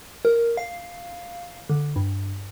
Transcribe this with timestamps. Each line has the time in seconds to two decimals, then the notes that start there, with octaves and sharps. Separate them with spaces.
0.25 A#4
0.57 F5
1.70 D3
1.96 G2